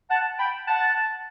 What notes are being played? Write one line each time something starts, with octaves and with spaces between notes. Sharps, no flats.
F#5 A5
G5 B5
F#5 A5